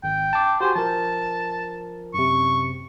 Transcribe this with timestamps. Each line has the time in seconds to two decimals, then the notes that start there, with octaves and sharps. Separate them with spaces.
0.04 G#1 G5
0.33 A5 D6
0.61 F#4 G4 C5 G#5
0.76 F3 A#4 A5
2.14 F#2 C3 C#6